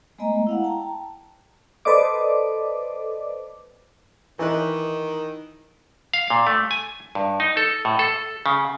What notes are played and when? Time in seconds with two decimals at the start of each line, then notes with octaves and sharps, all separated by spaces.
0.19 G#3 A3 B3 D#5 G#5 A#5
0.47 E4 F5 F#5
0.62 G5 A5 A#5
1.85 A4 B4 C5 D5 D#5 D6
4.39 D#3 E3 D#4 B4
6.13 F5
6.30 A#2
6.47 A3
6.71 G#5
7.15 G2
7.40 D#4
7.57 A4
7.85 A2
7.99 A4
8.46 C#3